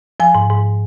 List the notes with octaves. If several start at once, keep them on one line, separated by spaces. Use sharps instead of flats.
F3 G#5
G#2
G#2